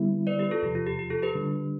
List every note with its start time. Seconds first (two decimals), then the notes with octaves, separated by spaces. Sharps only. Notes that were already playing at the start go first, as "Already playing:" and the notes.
Already playing: D3 G3 B3 E4
0.27 B4 D5
0.39 G4 B4
0.51 F4 A4
0.62 E2 C3 F3 G4
0.75 F4
0.87 G4
0.99 G4
1.10 F4 A4
1.23 G4 B4
1.35 D3 G3 D4